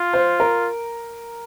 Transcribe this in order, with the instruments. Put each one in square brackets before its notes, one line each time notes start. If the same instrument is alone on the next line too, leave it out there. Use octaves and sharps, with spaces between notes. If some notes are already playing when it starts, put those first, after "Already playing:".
Already playing: [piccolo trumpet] F4
[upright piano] C5
A#4